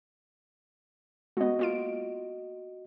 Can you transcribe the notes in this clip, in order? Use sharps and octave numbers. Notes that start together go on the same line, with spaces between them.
G#3 B3 F#4 D#5
A#3 F4 D7